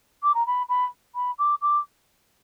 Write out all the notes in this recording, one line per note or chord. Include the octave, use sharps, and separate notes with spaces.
D6
A#5
B5
B5
B5
D6
D6